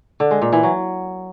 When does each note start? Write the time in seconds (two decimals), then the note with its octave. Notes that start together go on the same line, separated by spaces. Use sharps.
0.20 D3
0.31 G#3
0.42 A#2
0.52 E3
0.63 F#3